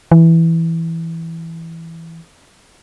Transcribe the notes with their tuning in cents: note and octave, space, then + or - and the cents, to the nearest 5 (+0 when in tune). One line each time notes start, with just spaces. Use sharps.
E3 +0